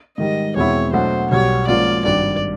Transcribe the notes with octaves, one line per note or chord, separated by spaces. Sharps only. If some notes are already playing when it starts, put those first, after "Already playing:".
G#2 D#3 G3 D#5
E2 B2 G#3 C4 E4 C#5
B2 F#3 A3 D4 F#4 C5
B1 B2 G3 C#5
G#2 F3 A#3 C#4 F4 D5
G#1 G2 D#3 G3 D5